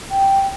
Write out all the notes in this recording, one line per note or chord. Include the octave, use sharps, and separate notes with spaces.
G5